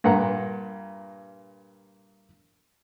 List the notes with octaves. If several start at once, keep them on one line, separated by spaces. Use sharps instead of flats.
G2 A#2 F#5 A#5